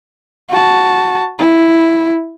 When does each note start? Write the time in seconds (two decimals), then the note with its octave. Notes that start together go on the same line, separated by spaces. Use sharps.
0.50 F#4 A5
1.39 E4